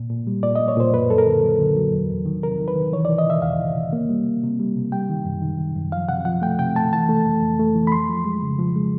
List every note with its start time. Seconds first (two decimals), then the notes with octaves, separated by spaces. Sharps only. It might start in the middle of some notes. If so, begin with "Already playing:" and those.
Already playing: A#2
0.10 A#2
0.27 G3
0.43 A#2 D5
0.56 A#3 D#5
0.68 C#5
0.77 A#2 C5
0.94 F#2 B4
1.10 F#2 A4
1.18 A#4
1.26 D3
1.43 F#3
1.60 D3
1.76 F#3
1.93 E2
2.09 E2
2.26 D#3
2.43 C3 A#4
2.59 D#3
2.68 B4
2.76 D#3
2.93 E3 C#5
3.05 E3 D5
3.18 D#5
3.27 E3 E5
3.42 E2 F5
3.60 E3
3.76 C3
3.93 A#3
4.10 G3
4.26 A#3
4.43 C3
4.60 G3
4.76 C3
4.92 G3 G5
5.10 D#3
5.25 F#2
5.42 D#3
5.59 D#3
5.76 F#2
5.92 F3 F5
6.09 C3 F#5
6.25 F3 F#5
6.42 A3 G5
6.59 C3 G5
6.76 A3 A5
6.93 E3 A5
7.09 A3
7.25 F2
7.42 F2
7.59 A3
7.75 E3
7.87 B5
7.92 F2 C6
8.09 F3
8.25 G#3
8.42 C#3
8.59 F3
8.75 G#3